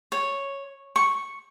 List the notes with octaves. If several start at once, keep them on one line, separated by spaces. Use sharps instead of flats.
C#5
C#6